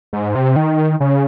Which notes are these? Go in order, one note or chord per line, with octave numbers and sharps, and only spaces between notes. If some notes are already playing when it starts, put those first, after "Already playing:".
G#2
C3
D#3
C#3